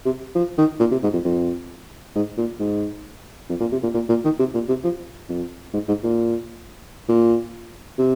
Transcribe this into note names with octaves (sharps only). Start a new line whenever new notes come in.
C3
F3
D#3
A#2
C3
G#2
F2
F2
G#2
A#2
G#2
F2
A#2
C3
A#2
A#2
A#2
D#3
C3
A#2
C3
F3
F2
G#2
G#2
A#2
A#2
C3